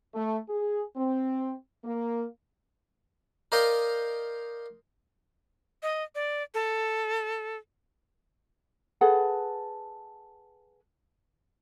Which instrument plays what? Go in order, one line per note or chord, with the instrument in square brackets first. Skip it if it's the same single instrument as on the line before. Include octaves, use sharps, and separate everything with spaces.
[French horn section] A3
G#4
C4
A#3
[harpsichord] A#4 C5 D5 D#5 F5 G5
[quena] D#5
D5
A4
[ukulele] G#4 A4 B4 F#5